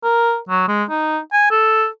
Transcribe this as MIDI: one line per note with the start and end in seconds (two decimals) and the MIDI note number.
0.04 0.37 70
0.49 0.64 54
0.68 0.84 56
0.90 1.18 63
1.33 1.51 80
1.51 1.87 69